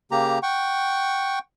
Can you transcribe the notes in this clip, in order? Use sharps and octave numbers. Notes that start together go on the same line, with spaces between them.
C#3 A#3 G4 A#5
F#5 G5 C#6